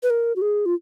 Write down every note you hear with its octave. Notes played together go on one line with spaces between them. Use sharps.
B4
A#4
F#4
G#4
F4